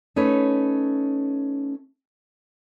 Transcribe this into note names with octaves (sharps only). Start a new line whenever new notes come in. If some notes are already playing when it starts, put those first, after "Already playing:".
A3 C#4 D#4 B4 C#5